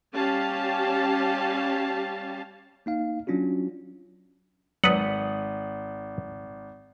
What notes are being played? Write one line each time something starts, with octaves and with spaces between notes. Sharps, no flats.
G3 C#4 G4 F5 A5
A#3 D#4 F5
F#3 C#4 D4 F4 F#4
G#1 F#3 B4 D5 F#5 D#6